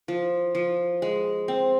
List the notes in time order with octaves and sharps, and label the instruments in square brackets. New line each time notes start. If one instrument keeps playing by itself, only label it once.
[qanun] F3
F3
G#3
C4